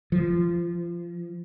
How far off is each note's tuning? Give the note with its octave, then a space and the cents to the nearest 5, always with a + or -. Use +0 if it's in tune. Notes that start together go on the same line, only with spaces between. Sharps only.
F3 -20